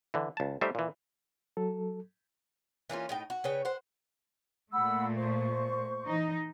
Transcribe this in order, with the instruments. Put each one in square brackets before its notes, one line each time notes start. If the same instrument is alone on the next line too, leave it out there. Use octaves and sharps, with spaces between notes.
[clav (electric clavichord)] D3 E3
C#2 A5
G3 A3 D#4 G4 C5 E5
A#2 E3
[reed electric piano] F#3 A4
[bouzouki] E3 A#3 C#4 F4
A2 D#4 G5
F#4
C#3 B4 C#5 G5
C5 F#5
[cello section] A#2 A3 [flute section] F#5 B5 E6
[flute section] C5 C#6
[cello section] E3 D#4